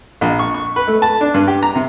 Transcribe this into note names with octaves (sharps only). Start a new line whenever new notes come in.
A#1
C#6
C#6
B4
A3
A5
D4
G2
G4
A#5
C3